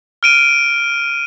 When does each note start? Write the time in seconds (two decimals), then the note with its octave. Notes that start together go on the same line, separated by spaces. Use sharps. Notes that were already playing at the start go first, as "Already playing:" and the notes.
0.23 F6 D7 D#7